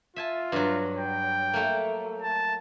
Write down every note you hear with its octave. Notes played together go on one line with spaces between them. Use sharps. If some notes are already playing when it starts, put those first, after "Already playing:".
F4 E5 G#5 A5
G2 F#3
G5
A3 A#3
A5